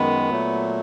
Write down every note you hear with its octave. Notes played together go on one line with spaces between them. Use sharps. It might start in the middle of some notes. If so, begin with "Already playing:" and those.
Already playing: F#2 D#3 G#3 B3
A#2 F#3 A3